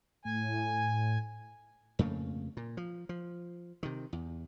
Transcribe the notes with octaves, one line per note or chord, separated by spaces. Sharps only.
A2 G#5
F2 C#3 A3 A#3
A#2
F3
F3
C3 D#3
E2